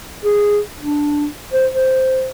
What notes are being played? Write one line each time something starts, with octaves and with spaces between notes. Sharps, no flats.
G#4
D4
C5
C5